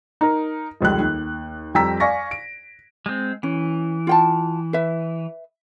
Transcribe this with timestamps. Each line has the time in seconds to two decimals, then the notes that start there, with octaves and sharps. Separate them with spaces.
0.21 D#4 A#4
0.81 F1 C#2 G3 F#6
1.00 D#2
1.75 F2 G3 G5 A#5 E6 B6
2.00 D5 F5 G#5 C#6 A#6
2.31 D7
3.06 G#3 C4
3.43 E3 C#4
4.07 F4 G5 A5
4.73 B4 E5